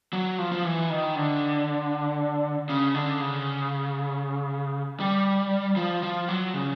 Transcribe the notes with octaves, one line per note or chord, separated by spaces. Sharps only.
F#3
F3
F3
E3
D#3
D3
C#3
D3
C#3
G3
F3
F3
F#3
C#3